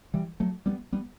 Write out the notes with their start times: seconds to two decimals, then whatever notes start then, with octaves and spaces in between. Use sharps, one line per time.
0.14 E3 G3
0.40 F#3 A3
0.66 G3 B3
0.92 G3 B3